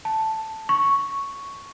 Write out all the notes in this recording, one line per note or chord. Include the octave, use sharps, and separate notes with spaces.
A5
C#6